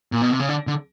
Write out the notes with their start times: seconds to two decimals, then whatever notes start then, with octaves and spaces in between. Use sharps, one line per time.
0.12 A#2
0.22 B2
0.30 C3
0.40 C#3
0.49 D3
0.67 D3